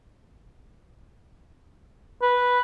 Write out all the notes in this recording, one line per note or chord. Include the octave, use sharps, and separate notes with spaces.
B4